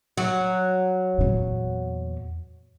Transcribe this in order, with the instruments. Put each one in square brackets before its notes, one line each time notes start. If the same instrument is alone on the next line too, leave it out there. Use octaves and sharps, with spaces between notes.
[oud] F#3
[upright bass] E2 A#2